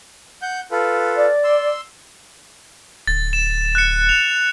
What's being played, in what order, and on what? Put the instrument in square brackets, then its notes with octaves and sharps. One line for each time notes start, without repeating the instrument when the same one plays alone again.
[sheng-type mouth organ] F#5 G6
F4 A4 B4
[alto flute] D5
[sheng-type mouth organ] C6 E6
[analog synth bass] D1 [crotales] A6
[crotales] E7
F#6 C#7
F7